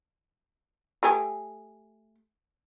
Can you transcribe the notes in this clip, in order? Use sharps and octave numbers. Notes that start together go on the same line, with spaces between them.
A3 G4 G#4